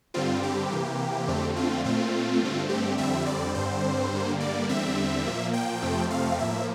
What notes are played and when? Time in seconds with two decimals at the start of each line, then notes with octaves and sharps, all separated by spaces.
0.14 G2 D3 G3 C4 F4
0.43 G4
0.71 C3 E3 A#3
1.27 F2 D3 A3 C4
1.56 F4
1.84 A#2 A3 C4 F4
2.41 G2 D3 A3 C4
2.69 G4
2.98 F2 D3 G3 C4 E5
3.26 D5
3.54 G2 D3 G3 C4 C5
4.12 G2 D3 G3 A#3
4.40 D5
4.68 E2 D3 G3 C4 E5
5.25 A#2 F3 A#3
5.53 G5
5.82 F2 C3 F3 A3 C4
6.10 F5
6.39 A2 F3 A#3 E5